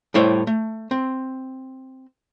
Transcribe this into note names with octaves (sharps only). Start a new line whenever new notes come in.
A2 G3 E4 C5 C#5
A3
C4